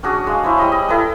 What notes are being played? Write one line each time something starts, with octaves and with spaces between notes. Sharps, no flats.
C#4 D4 F#4 G#4
G#3 F5
E4 C5 C#5
G3 E4 D#5 B5
D#5
E4 A4 B4